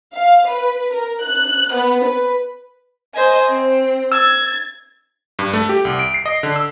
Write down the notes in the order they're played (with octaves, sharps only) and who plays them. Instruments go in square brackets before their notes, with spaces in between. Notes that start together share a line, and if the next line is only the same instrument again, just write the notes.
[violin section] F5
B4
A#4
F#6
B3
B4
[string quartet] C5 D#5 G#5
C4
[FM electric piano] E6 [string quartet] G#6 A6
[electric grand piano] G2
A3
G4
C2
D7
C7
D#5
D3
E6